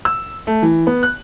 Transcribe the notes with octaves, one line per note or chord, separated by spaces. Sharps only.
E6
A3
E3
B3
F#6